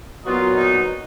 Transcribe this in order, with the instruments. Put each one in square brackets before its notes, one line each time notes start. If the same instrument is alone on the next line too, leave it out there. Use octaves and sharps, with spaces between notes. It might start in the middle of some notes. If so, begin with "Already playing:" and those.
[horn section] A#2 F#3 B3 D#4 F4
D#4